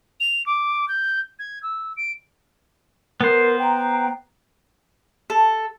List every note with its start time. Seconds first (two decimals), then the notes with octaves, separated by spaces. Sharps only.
0.20 F7
0.46 D6
0.88 G6
1.39 G#6
1.63 E6
1.97 D7
3.21 B3 A#4 C5
3.59 G5 A#5
5.30 A4